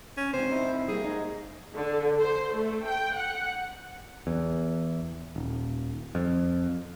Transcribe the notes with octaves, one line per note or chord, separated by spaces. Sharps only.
C#4
G#2 C3 C5
C3 D#4 E4
G3 A#3 G#4
G#3 D#4
D3
C5
A3
G5
F#5
E2
D#1
F2